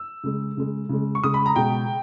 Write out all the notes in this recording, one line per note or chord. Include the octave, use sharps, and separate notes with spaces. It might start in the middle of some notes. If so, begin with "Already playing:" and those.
Already playing: E6
C#3 G#3
C#3 G#3
C#3 G#3
C#6
C#3 G#3 D#6
B5
A#5
B2 G#3 G5